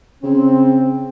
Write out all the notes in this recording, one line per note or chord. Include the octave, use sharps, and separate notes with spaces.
C#3 C4